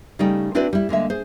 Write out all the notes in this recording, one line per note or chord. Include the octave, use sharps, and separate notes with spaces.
C#3 G3 A3 D#4 D5 G5
C4 D4 E4 F#4 B4 D5
G3 E4
D3 G#3 A#3 E5
G#4 C5